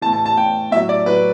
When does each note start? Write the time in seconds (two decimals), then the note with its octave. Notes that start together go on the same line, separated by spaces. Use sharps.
0.01 E3 A5
0.06 A2
0.13 A5
0.26 A5
0.37 A2 E3 G5
0.71 A2 E5
0.76 F#3
0.89 D5
1.06 A2 F#3 B4